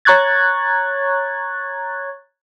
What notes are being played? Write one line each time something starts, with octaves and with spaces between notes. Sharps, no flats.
C#5 A#5 C#6 F#6 G#6 A6